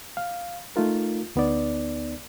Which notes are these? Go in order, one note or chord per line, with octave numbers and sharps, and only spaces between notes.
F5
A3 D#4 F4 A#4
D2 B3 D#4 D5